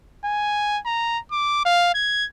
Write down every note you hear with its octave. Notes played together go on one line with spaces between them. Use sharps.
G#5
A#5
D6
F5
G#6